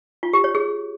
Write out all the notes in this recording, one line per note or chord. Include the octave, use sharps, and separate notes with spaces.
F4
G4
C#5
G#4